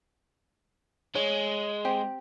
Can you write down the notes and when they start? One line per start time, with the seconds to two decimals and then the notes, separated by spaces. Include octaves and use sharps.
1.15 G#3 C#5
1.85 C4 G4